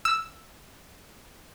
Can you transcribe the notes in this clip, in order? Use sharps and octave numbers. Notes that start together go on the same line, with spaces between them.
E6